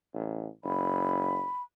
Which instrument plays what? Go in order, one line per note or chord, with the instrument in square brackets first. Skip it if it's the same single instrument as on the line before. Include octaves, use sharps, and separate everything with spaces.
[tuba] A1
[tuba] F#1 [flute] B5